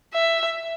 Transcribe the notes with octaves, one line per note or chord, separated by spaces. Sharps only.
E5